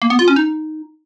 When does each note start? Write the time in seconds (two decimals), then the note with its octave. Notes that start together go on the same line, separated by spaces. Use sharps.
0.02 A#3
0.10 B3
0.19 F4
0.28 C#4
0.36 D#4